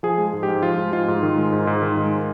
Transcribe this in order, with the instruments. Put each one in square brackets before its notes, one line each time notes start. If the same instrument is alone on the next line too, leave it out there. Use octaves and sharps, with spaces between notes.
[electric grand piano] F3 G#4
G#3
G#2
G4
G#2
F3 F4
G#3
G#2 F4
G#2
D#3
G#3
G#2
G#2
D#3
G#3